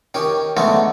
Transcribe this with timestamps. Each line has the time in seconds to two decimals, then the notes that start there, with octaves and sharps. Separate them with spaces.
0.14 D#3 C#4 G4
0.57 D3 G#3 A3 B3 C#4 D#4